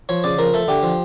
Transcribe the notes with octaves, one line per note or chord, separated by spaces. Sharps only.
F3 C#5
C#3 D5
F3 A#4
A3 A4
D3 G4
F3